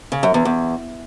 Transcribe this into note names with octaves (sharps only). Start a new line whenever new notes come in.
C#3
F#2
E2
E2